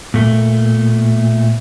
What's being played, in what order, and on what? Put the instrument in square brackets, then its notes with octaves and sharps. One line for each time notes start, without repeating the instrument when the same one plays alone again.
[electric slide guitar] A#2 A3